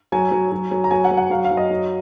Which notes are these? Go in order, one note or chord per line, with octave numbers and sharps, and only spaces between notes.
F#3 G#5
F#3
F#3
F#3
A#5
F#3 G#5
F#5
F#3
F#5
F#3 F5
F5
F#3
D#5
F#3